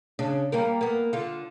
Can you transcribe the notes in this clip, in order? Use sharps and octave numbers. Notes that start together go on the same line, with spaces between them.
C#3 D4
G3 A#3 A#4
A#3 B3
D3 F4